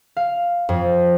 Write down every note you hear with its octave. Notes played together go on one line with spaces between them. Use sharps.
F5
F2